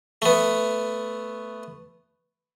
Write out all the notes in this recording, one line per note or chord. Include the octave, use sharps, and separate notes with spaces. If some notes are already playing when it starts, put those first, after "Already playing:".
A3 B3